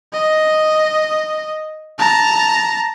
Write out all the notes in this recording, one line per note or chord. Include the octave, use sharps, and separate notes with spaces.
D#5
A5 A#5